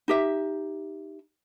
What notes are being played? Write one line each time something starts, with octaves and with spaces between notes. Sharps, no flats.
D#4 G4 E5